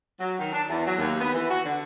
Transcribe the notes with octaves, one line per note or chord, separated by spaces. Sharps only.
F#3
D#3
D4
E2
F#3
D#2
B3
E3
F#4
D3